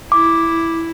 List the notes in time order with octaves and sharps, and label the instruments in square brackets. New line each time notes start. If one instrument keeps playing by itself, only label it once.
[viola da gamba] E4 [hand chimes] D6